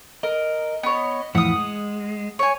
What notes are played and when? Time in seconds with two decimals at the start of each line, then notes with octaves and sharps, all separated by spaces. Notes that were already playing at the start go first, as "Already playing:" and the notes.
0.23 A#4 D#5
0.83 B3 C#5
1.35 F2 A2 E3 F#5 D#6
1.56 G#3
2.39 C#5 G#5